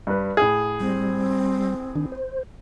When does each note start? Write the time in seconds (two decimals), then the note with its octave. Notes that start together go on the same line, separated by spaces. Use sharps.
0.07 G2 B4
0.37 A2 G#4
0.80 G3 C4
1.96 D#3 D4
2.12 C5